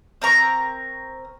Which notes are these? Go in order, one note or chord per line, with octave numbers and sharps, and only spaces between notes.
C4 A#4 A#5 C#6